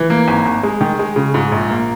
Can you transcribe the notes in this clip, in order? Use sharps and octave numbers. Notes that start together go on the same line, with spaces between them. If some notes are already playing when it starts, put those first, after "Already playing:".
Already playing: E3
A#3
G#1
G#1
G#3
D#3
G#3
C#3
G#2
A#1
A#3